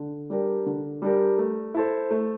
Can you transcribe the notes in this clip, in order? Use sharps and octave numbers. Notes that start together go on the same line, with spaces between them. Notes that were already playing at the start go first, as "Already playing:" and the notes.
Already playing: D3
G3 D4 G4 A#4
D3
G3 D4 G4 A#4
A3
E4 A4 C5
A3